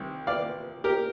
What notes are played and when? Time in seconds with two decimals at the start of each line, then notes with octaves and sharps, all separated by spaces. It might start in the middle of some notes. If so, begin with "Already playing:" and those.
Already playing: C2 C3 D#3
0.27 D5 F5
0.84 G4 A#4